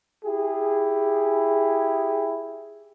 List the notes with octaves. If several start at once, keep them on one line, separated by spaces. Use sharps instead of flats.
E4 G4 G#4